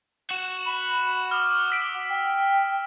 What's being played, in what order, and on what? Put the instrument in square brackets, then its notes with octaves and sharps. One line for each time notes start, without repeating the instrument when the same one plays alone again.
[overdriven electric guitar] F#4 [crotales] E7
[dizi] B5
[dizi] D6 [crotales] D#6 F6
[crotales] E6 B6 D7
[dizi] G5